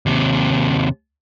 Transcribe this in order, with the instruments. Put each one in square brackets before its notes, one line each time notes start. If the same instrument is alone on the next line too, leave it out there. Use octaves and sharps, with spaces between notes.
[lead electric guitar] D#2 C3